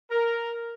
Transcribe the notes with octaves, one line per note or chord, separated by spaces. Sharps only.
A#4